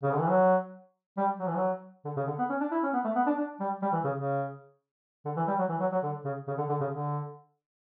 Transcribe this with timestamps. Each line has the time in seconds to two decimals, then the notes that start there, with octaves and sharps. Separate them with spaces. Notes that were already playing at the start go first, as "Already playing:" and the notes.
0.03 C#3
0.12 D3
0.21 E3
0.29 F#3
1.17 G3
1.39 F#3
1.48 E3
1.56 F#3
2.05 D3
2.17 C#3
2.27 D3
2.38 B3
2.49 C#4
2.61 D4
2.71 E4
2.83 C#4
2.94 B3
3.05 A3
3.16 B3
3.27 D4
3.37 D4
3.60 G3
3.82 G3
3.93 E3
4.04 C#3
4.15 C#3
5.25 D3
5.36 E3
5.48 G3
5.59 F#3
5.69 E3
5.80 F#3
5.92 F#3
6.03 D3
6.25 C#3
6.48 C#3
6.58 D3
6.69 D3
6.80 C#3
6.91 D3